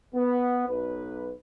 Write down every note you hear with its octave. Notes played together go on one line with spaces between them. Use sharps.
B3
B1 B4